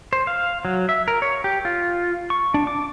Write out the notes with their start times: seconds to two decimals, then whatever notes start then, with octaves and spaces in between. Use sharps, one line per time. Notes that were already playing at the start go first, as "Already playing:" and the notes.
0.13 C5
0.27 F5
0.65 F#3
0.89 E5
1.08 A#4
1.22 C#5
1.44 G4
1.65 F4
2.30 C#6
2.54 D4
2.67 D6